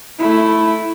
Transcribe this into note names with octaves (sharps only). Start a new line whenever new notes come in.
A3 E4